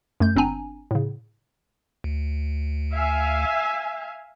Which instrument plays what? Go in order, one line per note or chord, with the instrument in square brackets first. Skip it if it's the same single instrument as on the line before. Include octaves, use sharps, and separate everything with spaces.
[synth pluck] F#2 A3 G6
G1 C4 D4 G#5 A#5
A2 C#3
[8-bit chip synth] D2
[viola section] E5 F5 G#5